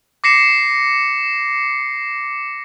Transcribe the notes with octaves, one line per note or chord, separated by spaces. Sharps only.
D6 A#6 C7 C#7 E7